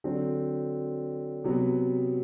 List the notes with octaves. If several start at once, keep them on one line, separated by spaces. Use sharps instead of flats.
D3 F#3 C4
C3 F#3 B3